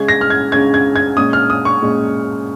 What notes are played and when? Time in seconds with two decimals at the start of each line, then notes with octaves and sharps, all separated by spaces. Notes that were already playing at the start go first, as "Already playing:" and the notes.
Already playing: C#3 G#3 C#4 G#6
0.08 A#6
0.21 F6
0.30 G#6
0.52 C#3 G#3 C#4 G#6
0.74 G#6
0.96 G#6
1.17 A#2 G#3 C#4 D#6
1.33 F6
1.50 D#6
1.65 C#6
1.82 A#2 G#3 C#4